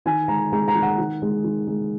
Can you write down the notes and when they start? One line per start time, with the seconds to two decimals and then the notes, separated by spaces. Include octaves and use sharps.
0.05 D#3 G#5
0.28 G#3 A#5
0.52 G#3 A#5
0.68 A#5
0.75 D#3
0.82 F#5
0.98 D#3
1.22 G#3
1.44 D#3
1.67 G#3